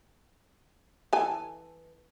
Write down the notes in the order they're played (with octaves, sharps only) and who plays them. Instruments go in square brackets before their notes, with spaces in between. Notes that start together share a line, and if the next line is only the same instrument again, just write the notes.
[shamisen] E3 A4 G#5